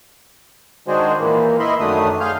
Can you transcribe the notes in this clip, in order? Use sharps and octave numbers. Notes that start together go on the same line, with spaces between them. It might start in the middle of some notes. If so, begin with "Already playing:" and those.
D#3 G#3 D4 F#4 G#4 C5
A#2 E3 A#3
E4 D#5 E5 B5 C6
F#2 D#3 F#3 A3 D4 D#6
G#4 F5 G#5 C6 F6 G6